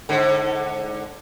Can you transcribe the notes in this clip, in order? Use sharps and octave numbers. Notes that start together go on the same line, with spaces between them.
G#2 D3